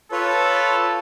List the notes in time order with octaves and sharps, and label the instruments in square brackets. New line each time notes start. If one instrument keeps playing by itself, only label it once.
[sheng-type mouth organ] F4 B4 C#5 [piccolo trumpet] A4